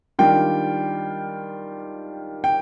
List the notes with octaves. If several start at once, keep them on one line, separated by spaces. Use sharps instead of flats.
D#3 G3 D4 F4 G5
G5